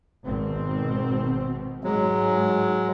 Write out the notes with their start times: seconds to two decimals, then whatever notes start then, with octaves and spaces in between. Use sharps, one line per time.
0.24 G#1 B2 C4
1.84 G#2 F#3 G#3